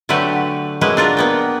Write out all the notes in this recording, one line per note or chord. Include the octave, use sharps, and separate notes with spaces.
D3 F#3 A3 G4 B4
F#3 G#3 A#3 E4 B4
D4 F4 A#4 D5
A#3 B3 G5